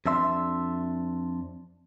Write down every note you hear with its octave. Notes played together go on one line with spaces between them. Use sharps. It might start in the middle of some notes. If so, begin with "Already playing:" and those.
F2 D4 E5 C6